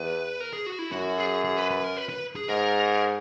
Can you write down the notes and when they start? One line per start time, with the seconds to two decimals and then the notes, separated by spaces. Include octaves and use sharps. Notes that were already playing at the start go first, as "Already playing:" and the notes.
Already playing: E2 B4
0.40 A#4
0.53 G#4
0.66 F#4
0.79 E4
0.92 F#2 F#4
1.18 G#4
1.45 G#4
1.57 B4
1.71 B4
1.84 A#4
1.97 B4
2.09 B4
2.36 G#4
2.48 G#2 A#4